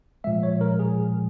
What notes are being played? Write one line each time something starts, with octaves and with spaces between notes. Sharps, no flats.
A#2 F3 G#3 E5
C#5
A#4
G#4